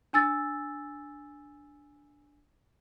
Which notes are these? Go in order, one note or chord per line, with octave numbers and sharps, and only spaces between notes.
D4 G#5 E6 A6